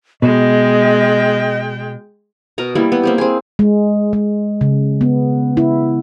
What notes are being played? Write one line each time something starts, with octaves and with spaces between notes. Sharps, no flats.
B2 G#3 D#5 G5
B2 A#4 D#5 A#5
G3 A#3 E4
B3
A#3 C4 G4
C4 G#4
G#3
G#3
C#3
B3
E4